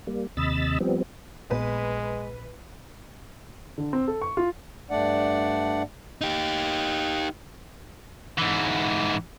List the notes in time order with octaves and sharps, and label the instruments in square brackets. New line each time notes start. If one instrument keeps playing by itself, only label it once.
[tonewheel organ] G3 A#3
D#2 C3 D#5 B5 E6 A6
F3 G3 B3 C4
[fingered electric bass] A#1 A#2 B3 [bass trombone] G#3 [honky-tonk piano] B4
[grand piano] D3
C4
A4
C#6
F4
[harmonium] G2 A3 D4 D5 F#5
[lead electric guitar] D#4 G4
[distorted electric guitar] G#2 E3